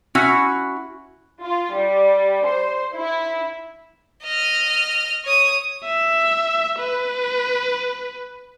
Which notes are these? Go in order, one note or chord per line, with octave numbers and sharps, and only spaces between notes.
C#4 E4 F#4
F4
G3
C5
E4
D#5 F6
C#5 D#6
E5
B4